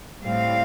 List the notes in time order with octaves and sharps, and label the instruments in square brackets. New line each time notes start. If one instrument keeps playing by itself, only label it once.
[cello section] A2 G3 C4 F5